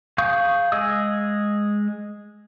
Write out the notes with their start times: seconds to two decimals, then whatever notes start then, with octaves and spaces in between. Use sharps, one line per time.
0.18 G#4 F5 C#6 D#6 G6
0.72 G#3 G#4 D#5 D#6 E6